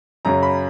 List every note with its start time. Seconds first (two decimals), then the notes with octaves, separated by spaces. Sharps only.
0.25 F#2 C#3 F#3 C#4 A#5
0.43 B5